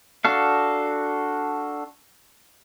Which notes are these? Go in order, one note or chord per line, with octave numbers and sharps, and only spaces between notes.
D4 F#4 A4 F5